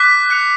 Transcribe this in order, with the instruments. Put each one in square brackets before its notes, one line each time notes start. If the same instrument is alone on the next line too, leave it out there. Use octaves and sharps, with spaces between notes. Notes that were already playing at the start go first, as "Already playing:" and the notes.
Already playing: [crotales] D6 F#6 B6
F#6 C#7 F7